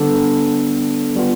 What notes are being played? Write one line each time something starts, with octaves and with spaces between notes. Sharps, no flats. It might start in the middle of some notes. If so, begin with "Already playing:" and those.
Already playing: D3 G3 B3 D4 A4
G3 B3 F4